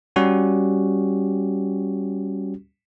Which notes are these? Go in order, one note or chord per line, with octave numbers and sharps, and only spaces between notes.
G3 C#4 F#4 G4